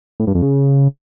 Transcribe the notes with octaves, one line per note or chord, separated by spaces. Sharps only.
A2
G2
F2
C#3